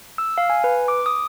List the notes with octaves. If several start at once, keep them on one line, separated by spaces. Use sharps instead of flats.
E6
F5
G#5
B4
D6
D#6